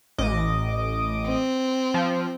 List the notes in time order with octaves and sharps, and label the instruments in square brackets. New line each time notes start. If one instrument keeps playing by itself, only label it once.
[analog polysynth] A1 D#5 D6
[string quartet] C4
[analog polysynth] F3